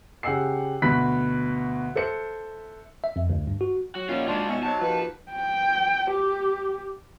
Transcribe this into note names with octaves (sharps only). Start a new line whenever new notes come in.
C#3 G4 F#5 G#5 E6 C7
D2 B2 B3 B5 F#6 B6
A4 C5 E5 C#7
E5
F2
D2
G2
F#4
F#3 F#4
A#2 E3 F3 G3 C#4 D#4 F#4 F5
F3 G#3 D4 F4
B2 C#4 E5
C3 F#3 A5
D#2 F3 B4
G5
G4